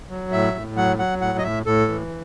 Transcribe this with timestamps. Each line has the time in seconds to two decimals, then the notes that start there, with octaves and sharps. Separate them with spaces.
0.09 F#3
0.32 A2 E5
0.54 A2
0.76 F#3 F#5
0.99 F#3 F#5
1.21 A2 F#5
1.39 D#5
1.43 A2 E5
1.66 A2 A4
1.88 E3